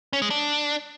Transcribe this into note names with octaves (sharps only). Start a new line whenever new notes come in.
C#4
G#3
D4